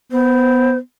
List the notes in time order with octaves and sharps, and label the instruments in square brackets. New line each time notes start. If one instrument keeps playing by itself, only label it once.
[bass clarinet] B3 [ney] C5